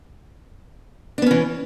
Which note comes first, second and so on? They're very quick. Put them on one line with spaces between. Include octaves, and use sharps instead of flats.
D4 B3 C#4 E3